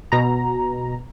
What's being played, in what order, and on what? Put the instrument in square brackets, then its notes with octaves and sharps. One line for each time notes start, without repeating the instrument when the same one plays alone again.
[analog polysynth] B2 A#5